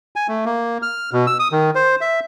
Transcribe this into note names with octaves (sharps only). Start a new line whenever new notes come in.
G#5
A3
A#3
F6
B2
E6
D#6
D#3
C5
E5